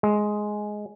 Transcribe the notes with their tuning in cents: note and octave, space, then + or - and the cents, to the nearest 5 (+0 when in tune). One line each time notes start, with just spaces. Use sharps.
G#3 +10